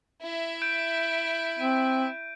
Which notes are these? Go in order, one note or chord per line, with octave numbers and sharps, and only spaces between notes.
E4 E5
G6 D7
C4 D#7